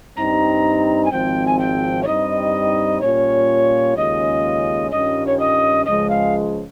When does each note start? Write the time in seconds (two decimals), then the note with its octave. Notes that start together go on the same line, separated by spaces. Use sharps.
0.16 G2 G3 C4 D#4 A#5
1.04 G#5
1.11 G#1 G#2 F3 C4 G5
1.46 G#5
1.59 G5
2.02 C#5
2.06 G2 G3 C4 D#4 D#5
3.00 A#2 G3 C#4 F4 C#5
3.96 D#2 C#3 G#3 C#4 F4 D#5
4.91 G2 D#3 G3 C#4 F4 D#5
5.26 C#5
5.39 D#5
5.85 C#2 C#3 F3 G#3 D#5
6.09 F5